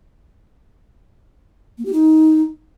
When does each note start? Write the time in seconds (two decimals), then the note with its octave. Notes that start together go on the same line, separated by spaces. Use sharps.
1.78 A#3
1.85 G4
1.93 D#4